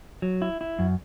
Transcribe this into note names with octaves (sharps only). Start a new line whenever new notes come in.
F#3
E4
E4
F#2